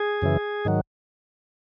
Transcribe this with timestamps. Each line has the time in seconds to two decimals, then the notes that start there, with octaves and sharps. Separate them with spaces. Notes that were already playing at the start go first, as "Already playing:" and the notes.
Already playing: G#4
0.22 F#2 C#3 E3
0.65 G#2 D#3 F#3